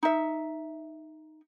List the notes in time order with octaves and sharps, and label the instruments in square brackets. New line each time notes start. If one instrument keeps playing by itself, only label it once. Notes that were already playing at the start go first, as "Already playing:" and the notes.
[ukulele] D#4 E5